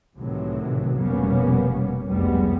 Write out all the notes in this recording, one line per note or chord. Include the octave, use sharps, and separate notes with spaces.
C2 A2 C3 D#3 E3 F#3
F1 B2 G3 A#3 B3 C#4
F1 C2 F#2 G3 G#3 B3